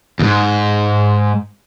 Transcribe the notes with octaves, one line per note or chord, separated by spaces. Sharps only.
E2 G#2